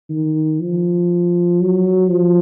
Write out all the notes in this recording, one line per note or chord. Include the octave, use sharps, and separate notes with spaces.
D#3
F3
F#3
F3